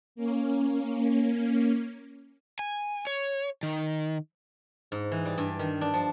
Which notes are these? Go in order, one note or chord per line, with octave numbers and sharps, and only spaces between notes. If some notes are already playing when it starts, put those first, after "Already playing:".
A#3 C#4
G#5
C#5
D#3
G#2
E3
G3
G2
D#3
D4
F3